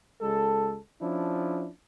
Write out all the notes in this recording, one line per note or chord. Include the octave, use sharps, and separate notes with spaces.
C#2 G#3 A4
F3 C#4 D4 E4